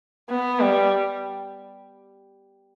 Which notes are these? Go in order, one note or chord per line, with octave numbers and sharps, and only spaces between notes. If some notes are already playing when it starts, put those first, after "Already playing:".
B3
G3